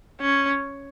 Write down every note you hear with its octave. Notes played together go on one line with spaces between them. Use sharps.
C#4